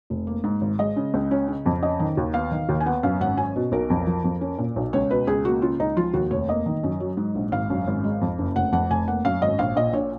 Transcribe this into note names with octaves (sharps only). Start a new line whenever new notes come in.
F1
A#3
G#2
G#1
G#3 D#5
C#3
C#2
C#4
C#3
F2
C#4 D#5
D#3
D#2
B3 F5
D#3
D#2
G#5
B3 F#5
F#2 F5
G#1 F#5
C#4 G#5
B2
B1 A#4
F2
F3
F2
C#4
A#2
B1
C#2 C#5
B2 B4
C#2 G#4
A#3 F#4
C#3 F4
C#2 D#4
F3 F4
D#2 F#4
F1 C#5
A#3 D#5
D#3
F#2
F#3
G#2
A#1
G#1 F5
F#2
G#1
G#3
F2
F#1
F1 F#5
F2 F#5
F1 G#5
A#3 F#5
F#2 F5
G#1 D#5
A#1 F5
A#2 D#5
A#1 C#5